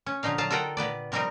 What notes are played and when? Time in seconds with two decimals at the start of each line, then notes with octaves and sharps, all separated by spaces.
0.06 C#4
0.23 A#2 D3 F3 D#4 F5
0.38 F#3 F5 A5 A#5
0.50 F4 A4 A#4 F#5 G5
0.77 A#2 B3 B4 D5
1.12 C3 F3 G3 C4 D#4 A#4